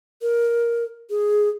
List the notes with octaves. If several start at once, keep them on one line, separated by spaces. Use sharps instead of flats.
A#4
G#4